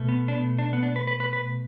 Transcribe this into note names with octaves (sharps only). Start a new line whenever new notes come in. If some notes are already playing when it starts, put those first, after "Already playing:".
Already playing: B2 A3
B3
D4
B3
D4
B3
D4
B4
B4
B4
B4